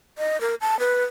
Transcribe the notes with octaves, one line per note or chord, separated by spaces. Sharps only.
D#5
A#4
A5
B4